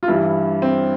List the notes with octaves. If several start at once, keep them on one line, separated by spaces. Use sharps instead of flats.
F4
G2 E3 G3 E4
C4